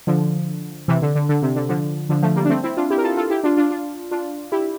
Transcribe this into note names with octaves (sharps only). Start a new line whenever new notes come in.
D3 F3
C3 E3
D3
D3
D3
C3
D3
D3 F3
D3 F3
F3 A3
G3 A#3
D4
A3 C4
C4 E4
D4 F4
E4 G4
A#4
F4 A4
F4 A4
E4 G4
D4 F4
D4 F4
D4 F4
D4 F4
E4 G4